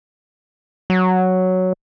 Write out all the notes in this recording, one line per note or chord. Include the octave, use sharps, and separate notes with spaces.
F#3